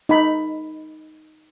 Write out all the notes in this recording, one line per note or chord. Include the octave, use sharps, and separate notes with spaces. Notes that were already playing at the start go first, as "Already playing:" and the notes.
D#4 B5